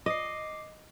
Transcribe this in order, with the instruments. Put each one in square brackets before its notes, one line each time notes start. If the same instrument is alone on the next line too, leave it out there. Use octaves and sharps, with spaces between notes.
[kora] D#5 [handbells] D6 C7